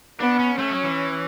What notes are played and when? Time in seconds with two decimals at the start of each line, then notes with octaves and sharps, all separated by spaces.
0.20 B3 D4
0.39 C#4
0.58 A3 C#4
0.71 F#3
0.84 E3